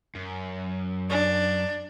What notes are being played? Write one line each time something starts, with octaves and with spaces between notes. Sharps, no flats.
F#2
D4